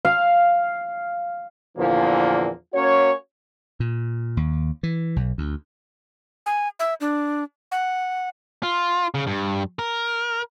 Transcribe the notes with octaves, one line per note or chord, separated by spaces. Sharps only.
F5
E2 A#2 D3 E3 F3 A#3
A#3 C#4 F#4 C#5
A#2
D#2
E3
B1
D2
G#5
E5
D4
F#5
F4
C#3
G2
A#4